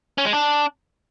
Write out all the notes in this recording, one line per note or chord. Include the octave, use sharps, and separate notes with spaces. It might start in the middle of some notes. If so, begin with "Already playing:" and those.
C#4
G#3
D4